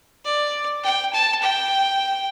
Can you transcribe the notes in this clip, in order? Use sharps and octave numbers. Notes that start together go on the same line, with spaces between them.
D5
G5
A5
G5